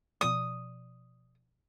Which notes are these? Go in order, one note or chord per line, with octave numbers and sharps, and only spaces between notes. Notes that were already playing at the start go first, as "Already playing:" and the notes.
B2 F3 D5 D#6